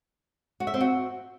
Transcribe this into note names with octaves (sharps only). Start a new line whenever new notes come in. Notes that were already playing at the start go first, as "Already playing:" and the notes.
F#4
E5
C4
F#4